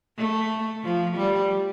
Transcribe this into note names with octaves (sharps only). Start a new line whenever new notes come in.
A3
F3
G3